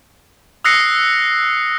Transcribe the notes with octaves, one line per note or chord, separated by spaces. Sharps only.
D#6 E6 F#6 A#6 C7 C#7